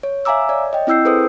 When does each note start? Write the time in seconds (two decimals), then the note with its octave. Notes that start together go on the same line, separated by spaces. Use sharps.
0.03 C#5
0.25 E5 F5 G#5 A#5 D6 E6
0.49 C#5 D5
0.73 D#5 G5
0.87 C4 E4 G5 E6 G6 C7
1.05 G#4 A4 B4 C5 D#6